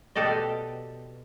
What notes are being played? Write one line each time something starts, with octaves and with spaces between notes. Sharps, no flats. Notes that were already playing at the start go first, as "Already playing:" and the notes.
B2 G4 A4 D5 D#5